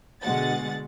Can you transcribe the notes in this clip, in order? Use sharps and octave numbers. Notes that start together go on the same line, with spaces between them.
B2 D3 G#3 F#5 A6